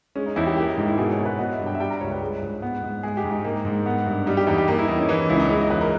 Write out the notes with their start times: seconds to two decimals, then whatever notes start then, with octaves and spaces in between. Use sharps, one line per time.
0.15 G#3 C#4
0.26 D#4
0.36 E2 E4
0.46 G4
0.57 A#3 G4
0.67 D#4
0.77 G#2 D#4
0.88 E4
0.98 B2 G#4
1.12 C#5
1.18 B2
1.26 B4
1.39 B3 D#5
1.53 E5
1.60 G2
1.66 G5
1.75 E5
1.80 G3 G5
1.90 A#5
2.01 C#2 C#5
2.11 B4
2.21 G#3
2.42 G#2
2.62 B3
2.83 G#2
3.03 G#3 G#4
3.17 G4
3.24 G#2
3.31 D#4
3.45 A#3
3.65 G#2
3.86 B3
4.06 G2
4.26 G3 D#4
4.37 G4
4.47 E2 D#4
4.58 G4
4.68 A#3 D#4
4.78 E4
4.88 E2 D#4
4.99 C#4
5.09 E3 D#4
5.19 C#4
5.29 C#2 E4
5.36 C#4
5.40 D#4
5.50 G#3 E4
5.61 D#5
5.70 E2 B4
5.81 A#4